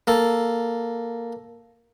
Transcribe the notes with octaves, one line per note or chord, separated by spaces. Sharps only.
A#3 A4